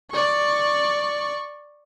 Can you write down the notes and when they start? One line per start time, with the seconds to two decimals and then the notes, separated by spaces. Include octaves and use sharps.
0.12 D5 C#6